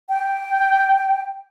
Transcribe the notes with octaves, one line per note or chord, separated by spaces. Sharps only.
G5